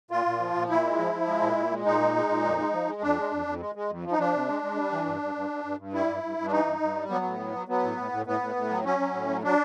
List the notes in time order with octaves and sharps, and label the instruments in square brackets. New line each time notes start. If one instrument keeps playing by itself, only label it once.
[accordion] A#2 F4
A#2
F3
A#2
A#2 E4
G#3
F3
F3
G#3
A#2
A#2
G#3
A#2 D#4
G#3
G#3
A#2
F2
G#3
F3
G#3
F2 D4
G#3
F2
F2
G#3
G#3
F2
F3
D#4
F3 D4
C3
G#3
G#3
G3
E3
G2
G2
G2
G2
G2
G2
G3 E4
G2
G2
G2
D4
E3 D#4
G2
G2
G3
F#3 B3
A2
F#3
F#3
F#3 B3
A2
A2
A2
A2 B3
A2
A2
F#3
F#3 C#4
F#3
A2
F#3
F#3 D4